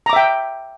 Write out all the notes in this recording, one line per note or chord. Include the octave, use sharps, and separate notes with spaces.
E5 G5 A#5 D6